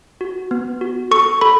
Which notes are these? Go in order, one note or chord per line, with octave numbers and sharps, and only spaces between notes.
F#4
B3
F#4
A4 C#6
A4 B5